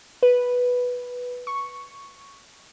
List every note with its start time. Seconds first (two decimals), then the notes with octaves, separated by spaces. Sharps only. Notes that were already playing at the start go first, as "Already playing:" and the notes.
0.23 B4
1.47 C#6